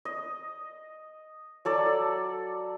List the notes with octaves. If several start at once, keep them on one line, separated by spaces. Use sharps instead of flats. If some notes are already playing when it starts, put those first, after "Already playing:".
D#5
F#3 A4 D5